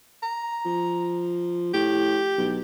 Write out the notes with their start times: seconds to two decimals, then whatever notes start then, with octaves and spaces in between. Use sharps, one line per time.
0.23 A#5
0.65 F3
1.74 A2 G4
2.38 B1